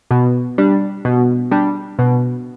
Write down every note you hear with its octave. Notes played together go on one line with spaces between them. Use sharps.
B2
G3 D4
B2
G3 D4
B2